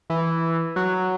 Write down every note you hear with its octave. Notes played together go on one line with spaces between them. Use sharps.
E3
F#3